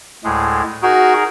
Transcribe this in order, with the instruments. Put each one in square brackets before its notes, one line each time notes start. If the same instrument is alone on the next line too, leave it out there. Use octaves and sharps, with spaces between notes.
[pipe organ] D2 A2 G#3
[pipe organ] D#4 G#4 A#4 [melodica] F#4